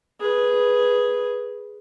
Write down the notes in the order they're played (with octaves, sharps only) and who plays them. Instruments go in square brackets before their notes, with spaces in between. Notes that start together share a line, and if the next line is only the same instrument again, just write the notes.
[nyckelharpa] G#4 B4